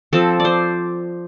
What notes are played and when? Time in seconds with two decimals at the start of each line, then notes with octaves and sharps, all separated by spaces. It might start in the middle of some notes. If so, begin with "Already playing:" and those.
0.13 F3 C4 A4
0.40 D5
0.45 C5